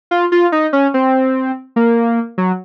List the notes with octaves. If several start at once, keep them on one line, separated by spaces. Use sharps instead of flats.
F4
F4
D#4
C#4
C4
A#3
F#3